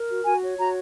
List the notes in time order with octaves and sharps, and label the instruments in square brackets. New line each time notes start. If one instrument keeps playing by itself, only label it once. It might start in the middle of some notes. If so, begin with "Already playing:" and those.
Already playing: [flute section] A#4
F#4
F#4 G#5
C#5
F#4 A#5